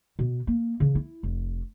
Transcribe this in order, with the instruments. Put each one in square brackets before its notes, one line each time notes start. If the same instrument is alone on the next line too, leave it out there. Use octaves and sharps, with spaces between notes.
[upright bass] B2
A#3
C#3 E3
E4
F1